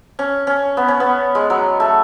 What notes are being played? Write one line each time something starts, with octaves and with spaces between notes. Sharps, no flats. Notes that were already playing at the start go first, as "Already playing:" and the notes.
C#4
C#4
B3
C#4
B3
G#3
F#3
A3